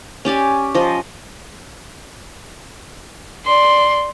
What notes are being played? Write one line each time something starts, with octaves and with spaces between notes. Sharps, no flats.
C#4 G4 D5 G#5
F3 D#5
D5 C6